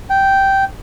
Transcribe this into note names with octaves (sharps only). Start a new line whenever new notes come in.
G5